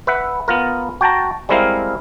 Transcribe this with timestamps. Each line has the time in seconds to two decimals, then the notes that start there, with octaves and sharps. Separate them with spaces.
0.07 B4 E5 F#5
0.48 B3 F4 A#4
1.01 F#4 G5 A5 A#5
1.49 G3 G#3 C4 E4 A#4 F5